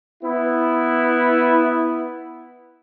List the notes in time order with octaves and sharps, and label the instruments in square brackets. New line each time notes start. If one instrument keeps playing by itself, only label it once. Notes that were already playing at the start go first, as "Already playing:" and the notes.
[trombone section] B3 E4